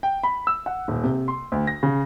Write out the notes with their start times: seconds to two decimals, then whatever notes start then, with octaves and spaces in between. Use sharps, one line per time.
0.03 G5
0.23 B5
0.47 E6
0.66 F#5
0.88 D#1
1.04 C3
1.28 C6
1.52 D2
1.67 A#6
1.83 C#3